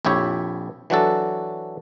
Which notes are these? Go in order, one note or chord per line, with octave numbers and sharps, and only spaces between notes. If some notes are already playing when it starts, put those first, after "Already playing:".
A#1 F2 E4 G4 C#5 E5
E3 F#3 D4 F#4 A4